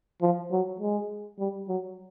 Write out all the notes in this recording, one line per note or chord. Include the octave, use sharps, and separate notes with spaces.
F3
F#3
G#3
G3
F#3